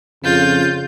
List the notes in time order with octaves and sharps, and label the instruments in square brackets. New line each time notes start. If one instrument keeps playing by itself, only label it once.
[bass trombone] F2 [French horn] C#3 [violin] F4 G6